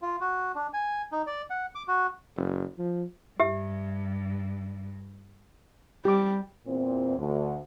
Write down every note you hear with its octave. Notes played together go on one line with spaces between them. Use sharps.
F4
F#4
D4
G#5
D#4
D5
F#5
D6
F#4
F#1
F3
G2 G4 E5
G3 G4 D6
E2 A#2 C4
D2